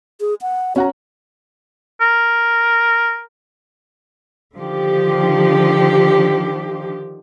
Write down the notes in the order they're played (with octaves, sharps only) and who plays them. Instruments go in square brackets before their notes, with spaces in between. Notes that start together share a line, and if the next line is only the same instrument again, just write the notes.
[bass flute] G#4
F#5
[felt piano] C#4 F#5 A#5 [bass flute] F#4
[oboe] A#4
[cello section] D3 D#3 F3 G4